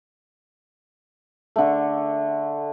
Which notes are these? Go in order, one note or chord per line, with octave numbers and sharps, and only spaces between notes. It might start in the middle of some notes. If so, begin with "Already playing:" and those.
D3 A3